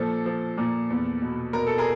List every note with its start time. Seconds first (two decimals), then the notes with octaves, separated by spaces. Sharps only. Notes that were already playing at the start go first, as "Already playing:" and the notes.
Already playing: A#2 F3 A4
0.26 F3
0.58 A#2
0.90 E2
1.22 B2
1.53 B2 A#4
1.67 A4
1.78 G#4 A#4